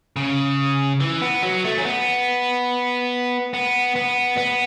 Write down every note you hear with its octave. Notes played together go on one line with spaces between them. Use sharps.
C#3
E3
B3
F#3
A3
C#4
B3
B3
B3
B3